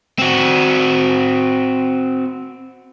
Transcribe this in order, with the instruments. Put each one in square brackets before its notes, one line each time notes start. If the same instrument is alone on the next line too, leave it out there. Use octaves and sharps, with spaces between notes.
[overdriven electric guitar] C4 F#4